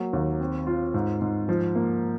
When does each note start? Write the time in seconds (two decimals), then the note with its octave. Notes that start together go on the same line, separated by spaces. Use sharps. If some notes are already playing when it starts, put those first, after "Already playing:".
Already playing: F#3 A#3
0.13 D#2
0.40 C4
0.67 F4
0.94 G#2
1.22 G#2
1.49 F3
1.75 A#3